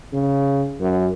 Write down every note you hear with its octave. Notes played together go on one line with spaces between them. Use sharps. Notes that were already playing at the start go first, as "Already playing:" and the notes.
C#3
F#2